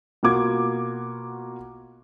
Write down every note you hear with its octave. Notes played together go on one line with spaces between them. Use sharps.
B2 A#3 F4 F#4 D6 G#6